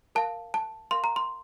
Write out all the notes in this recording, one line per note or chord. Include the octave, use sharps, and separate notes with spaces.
A#4 F5 A5
A5
A#4 F5 C6
A#5
C6